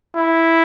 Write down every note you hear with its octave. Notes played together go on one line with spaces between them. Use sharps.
E4